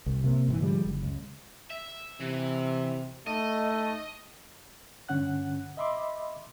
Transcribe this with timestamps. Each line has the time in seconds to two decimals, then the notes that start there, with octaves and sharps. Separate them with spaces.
0.06 C2
0.24 C3 A#3
0.48 G#2 D#3 E3
0.61 D3 F3 G3 G#3
0.85 F#1
1.03 C#2
1.70 E5
2.20 C3 E3
3.27 A3 D#4 D#5
5.09 G2 D3 C#4 F#5 F#6
5.77 D#5 E5 B5 C6 D6